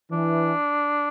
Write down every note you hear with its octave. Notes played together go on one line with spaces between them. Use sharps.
E3 D4